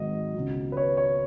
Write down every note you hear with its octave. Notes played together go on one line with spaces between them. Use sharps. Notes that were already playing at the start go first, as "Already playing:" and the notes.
Already playing: G#1 G#2 D#3 F#3 D#5
C#2 B2 F#3
B4
C#5
C#5